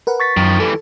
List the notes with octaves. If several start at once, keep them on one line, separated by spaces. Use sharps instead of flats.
A#4 B4 F#5
C#6 A6 B6
F#2 D#3 F3
E3 G3 A4